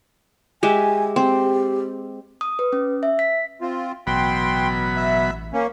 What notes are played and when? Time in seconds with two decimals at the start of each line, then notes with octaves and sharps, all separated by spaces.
0.63 G#3 G4 E5 G#5
1.16 C4 G4
2.41 D#6
2.59 B4
2.73 C#4
3.03 E5
3.19 B6
3.61 C4 F4
4.07 A1 B2 F#3 G5 B5 C6
4.96 E5
5.53 A#3 C#4